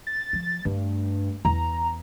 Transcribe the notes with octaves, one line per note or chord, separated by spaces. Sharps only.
A6
F3
G2 A3
E2 A#5